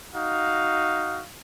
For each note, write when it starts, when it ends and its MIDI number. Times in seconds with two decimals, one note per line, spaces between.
0.15 1.22 63
0.15 1.22 66
0.15 1.22 77